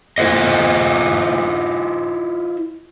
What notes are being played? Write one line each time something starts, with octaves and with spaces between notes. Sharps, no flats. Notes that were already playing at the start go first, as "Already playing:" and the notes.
E4 F4 G4 G#4 C5 D#5